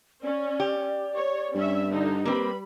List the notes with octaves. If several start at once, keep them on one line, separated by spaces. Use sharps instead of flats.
C#4 D5
G4
C#5
G2 C#4 E5
D3 D#4
G3 A#3 C4 B4 B5